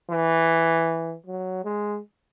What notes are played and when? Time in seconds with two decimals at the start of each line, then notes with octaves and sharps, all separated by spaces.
0.11 E3
1.26 F#3
1.64 G#3